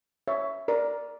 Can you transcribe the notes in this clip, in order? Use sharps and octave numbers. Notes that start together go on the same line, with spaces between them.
C#5 E5
A#4 D5